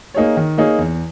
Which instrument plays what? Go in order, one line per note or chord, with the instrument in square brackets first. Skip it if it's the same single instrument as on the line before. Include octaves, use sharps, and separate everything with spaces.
[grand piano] A#3 D#4 G#4 C#5
D#3
A#3 D#4 G#4 C#5
E2